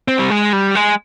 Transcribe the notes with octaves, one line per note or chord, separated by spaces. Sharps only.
C4
G3
G#3
G3
G#3